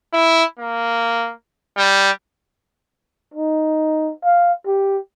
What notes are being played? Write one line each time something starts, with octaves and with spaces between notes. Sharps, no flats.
E4
A#3
G3
D#4
F5
G4